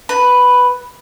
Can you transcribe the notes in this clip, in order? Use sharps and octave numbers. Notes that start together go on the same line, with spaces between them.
B4